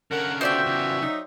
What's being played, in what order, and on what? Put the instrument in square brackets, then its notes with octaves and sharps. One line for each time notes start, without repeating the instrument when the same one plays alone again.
[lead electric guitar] D3 C#4 [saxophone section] A#4 [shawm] F#5
[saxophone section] B3 F4 F#4 [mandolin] C5 D5 G5 [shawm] E5
[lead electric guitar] C#3 E3
[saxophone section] F#3 D#4